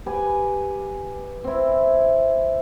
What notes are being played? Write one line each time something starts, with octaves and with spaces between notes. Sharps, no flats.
G4 B4 G#5
C4 E4